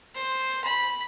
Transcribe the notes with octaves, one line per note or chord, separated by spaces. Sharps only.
C5
B5